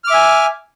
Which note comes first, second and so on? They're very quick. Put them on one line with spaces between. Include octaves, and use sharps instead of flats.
F6 D6 E5 G#5